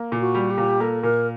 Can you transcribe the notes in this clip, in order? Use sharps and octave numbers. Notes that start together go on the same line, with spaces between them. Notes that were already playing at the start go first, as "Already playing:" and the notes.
Already playing: A#3
A#2
F#4
G3
G4
A#2
A#3 A4
A#2 A#4